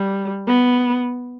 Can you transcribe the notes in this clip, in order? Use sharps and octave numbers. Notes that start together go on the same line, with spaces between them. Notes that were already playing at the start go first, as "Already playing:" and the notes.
Already playing: G3
B3